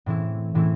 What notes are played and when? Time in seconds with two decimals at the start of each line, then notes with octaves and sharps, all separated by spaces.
0.06 A2 E3 C4 E4
0.55 A2 E3 C4 E4